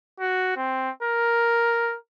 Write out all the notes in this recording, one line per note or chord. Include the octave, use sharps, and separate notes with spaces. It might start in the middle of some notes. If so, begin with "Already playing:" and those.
F#4
C4
A#4